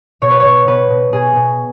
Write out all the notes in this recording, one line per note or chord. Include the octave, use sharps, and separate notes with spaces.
B2 C#5
B4
C#5
B2
B2 B4
B2
B2 G#4
B2